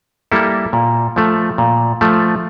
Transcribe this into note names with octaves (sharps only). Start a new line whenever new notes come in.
G3 A#3 E4 A4
A#2
F3 A3
A#2
F3 A3